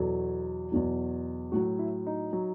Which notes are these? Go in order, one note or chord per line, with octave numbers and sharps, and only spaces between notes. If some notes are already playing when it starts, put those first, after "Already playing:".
Already playing: E2 B2 F#3 A4
E2 B2 F#3
A2 F#3 F#4
E4
D#4
F#3